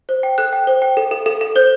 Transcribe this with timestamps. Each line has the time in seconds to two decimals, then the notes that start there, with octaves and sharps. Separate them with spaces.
0.09 C5
0.23 G5
0.38 A4 F#6
0.53 G5
0.67 C5
0.82 G5
0.97 A4
1.11 A4
1.26 A4
1.41 A4
1.56 C5 G6